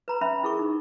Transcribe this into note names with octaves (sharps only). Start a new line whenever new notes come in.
B4 A#5 B5
C#4 E5 B5
E4 G#4 A#4 C#6
D#4